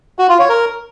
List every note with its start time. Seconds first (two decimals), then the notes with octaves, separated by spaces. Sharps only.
0.19 F#4
0.29 F4
0.39 C#5
0.49 A#4